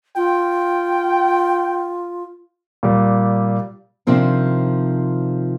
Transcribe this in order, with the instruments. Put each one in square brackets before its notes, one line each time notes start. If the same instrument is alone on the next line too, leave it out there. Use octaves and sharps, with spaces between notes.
[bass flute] F4 [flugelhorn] G5
[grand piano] A#2 G3
[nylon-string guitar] C3 D#3 F3 C4 D4